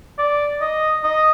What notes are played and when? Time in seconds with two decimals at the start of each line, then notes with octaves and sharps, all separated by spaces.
0.18 D5
0.61 D#5
1.04 D#5